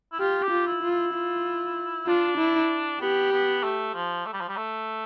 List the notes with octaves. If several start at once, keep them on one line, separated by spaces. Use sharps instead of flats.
E4
F4 G4
G4
F4
E4
F4
E4
F4
D4 F4
E4
B3 G4
B3
A3
F3
A3
G3
F3
G3
A3